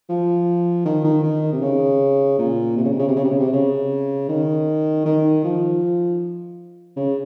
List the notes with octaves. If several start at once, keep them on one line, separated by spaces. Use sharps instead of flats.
F3
D#3
D#3
D#3
C3
C#3
A#2
C3
C#3
C3
C#3
C3
C#3
C3
C#3
C3
C#3
D#3
D#3
F3
C#3